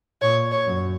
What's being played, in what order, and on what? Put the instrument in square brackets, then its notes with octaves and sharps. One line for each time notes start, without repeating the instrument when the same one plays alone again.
[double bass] A#2 [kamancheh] C#5
[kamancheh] C#5
[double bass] F#2